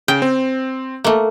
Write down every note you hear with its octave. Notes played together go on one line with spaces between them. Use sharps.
C#3 G5
C4
A3 A#3